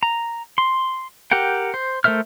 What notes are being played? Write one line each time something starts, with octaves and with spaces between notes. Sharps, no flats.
A#5
C6
G4 A#4 F#5 G5
C5
A3 A#4 C5 E5 F6